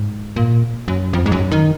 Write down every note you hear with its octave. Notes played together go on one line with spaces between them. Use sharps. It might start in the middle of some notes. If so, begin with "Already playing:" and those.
Already playing: G#2
A#2
F#2
F2
G#2
F#2
D#3